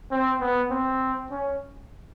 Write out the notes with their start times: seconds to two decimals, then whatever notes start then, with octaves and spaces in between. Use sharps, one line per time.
0.11 C4
0.41 B3
0.71 C4
1.31 C#4